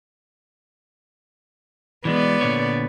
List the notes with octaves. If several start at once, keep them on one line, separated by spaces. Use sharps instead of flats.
E3 G3 G#3 B3 D5
A#2 D3 C#5